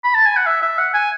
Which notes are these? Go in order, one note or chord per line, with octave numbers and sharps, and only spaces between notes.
B5
A5
G#5
F#5
E5
E5
F#5
G#5